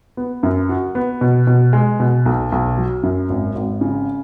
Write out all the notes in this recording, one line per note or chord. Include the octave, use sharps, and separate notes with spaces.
B3
F#2
F#4
B3
B2
B2
G#3
B2
B1
B1
F#3
F#2
G#1
G#1
C#3